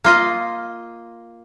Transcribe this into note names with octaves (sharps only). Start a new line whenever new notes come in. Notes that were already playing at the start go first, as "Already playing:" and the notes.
A#3 F4 D#5